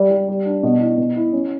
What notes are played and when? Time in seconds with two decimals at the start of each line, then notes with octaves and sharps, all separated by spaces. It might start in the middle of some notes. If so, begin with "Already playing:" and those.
Already playing: G3
0.11 G3
0.28 G3
0.45 D4
0.63 B2
0.80 E4
0.98 B2
1.16 E4
1.33 C#4